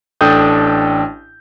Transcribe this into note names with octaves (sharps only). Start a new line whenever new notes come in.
A1 D4 A4 G5 D#6 G6